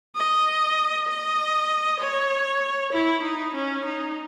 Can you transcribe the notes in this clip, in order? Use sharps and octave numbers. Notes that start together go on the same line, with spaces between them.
D#5
D#5
C#5
E4
D#4
C#4
D#4